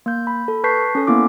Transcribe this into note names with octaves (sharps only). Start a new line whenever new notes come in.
A#3 G6
B5
A4
B4 A5 C#6 G6 B6 C7
C#4 A4
A#3 B3 E4 D6